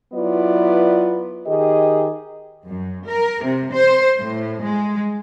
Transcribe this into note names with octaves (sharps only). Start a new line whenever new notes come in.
F#3 B3 E4 F4 B4 D5
D#3 G4 G#4 D#5
F#2
A#4
C3
C5
A2
G#3